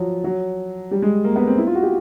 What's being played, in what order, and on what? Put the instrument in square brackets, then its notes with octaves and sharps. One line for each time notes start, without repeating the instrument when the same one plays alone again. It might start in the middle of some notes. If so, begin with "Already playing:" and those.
Already playing: [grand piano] F3 F#3
F#3
G3
G#3
A#3
B3
C4
E4
F4
F#4
G4